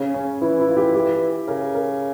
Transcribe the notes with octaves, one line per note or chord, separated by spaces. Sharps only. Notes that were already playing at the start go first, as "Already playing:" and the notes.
Already playing: C#3 C#4
C#4
E3 E4
E4
F4
G4
G4
C#3 A#4
A#4